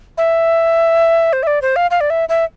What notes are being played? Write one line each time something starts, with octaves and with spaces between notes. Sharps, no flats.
E5
C5
E5
D5
C5
F5
F5
D5
E5
E5